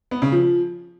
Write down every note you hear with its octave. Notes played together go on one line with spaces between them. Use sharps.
B3
C#3
F3